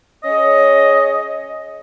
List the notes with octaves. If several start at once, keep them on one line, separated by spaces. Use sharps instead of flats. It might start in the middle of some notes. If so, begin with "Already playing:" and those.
C#4 G#4 C#5 D#5